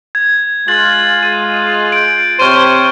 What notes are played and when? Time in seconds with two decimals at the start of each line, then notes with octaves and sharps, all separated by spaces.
0.15 G#6
0.68 G#3 F4 F#6 A6 F#7
1.23 D#7
1.92 G6 D7
2.40 C3 C5 C#5 C#6 F6 D#7